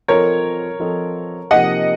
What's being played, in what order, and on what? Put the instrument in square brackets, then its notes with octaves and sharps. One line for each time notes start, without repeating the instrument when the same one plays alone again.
[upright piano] F3 C4 F4 A4 D#5 [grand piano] A#4 C#5
[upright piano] F3 C4 F4 A4 D#5
[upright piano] C3 F3 A#3 D#4 [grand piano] D#5 F#5